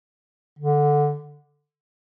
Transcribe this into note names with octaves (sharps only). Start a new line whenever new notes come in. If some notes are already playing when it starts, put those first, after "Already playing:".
D3